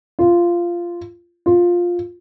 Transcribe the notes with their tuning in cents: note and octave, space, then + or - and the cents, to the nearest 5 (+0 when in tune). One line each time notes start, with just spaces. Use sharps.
F4 -10
F4 +10